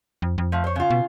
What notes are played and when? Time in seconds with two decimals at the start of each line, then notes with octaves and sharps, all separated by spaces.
0.22 F2
0.38 F2
0.52 F3 A3
0.64 C5 C#5
0.76 C#3 F4
0.90 B2